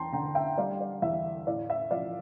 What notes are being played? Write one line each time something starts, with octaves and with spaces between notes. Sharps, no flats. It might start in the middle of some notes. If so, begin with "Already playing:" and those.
Already playing: E2 G5 A5 A#5 C6
D3 G5 A#5
E5 G5
G3 D5 F5
D5
E2 E5
A2 D5 F5
E5
F3 D5 F5